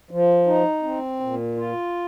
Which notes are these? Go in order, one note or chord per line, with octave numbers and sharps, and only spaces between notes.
F3
D#4
C4
A#2
F4